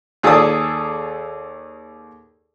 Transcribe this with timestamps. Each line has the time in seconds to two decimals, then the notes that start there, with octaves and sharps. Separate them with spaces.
0.23 D#2 G#4 A4 D5 D#6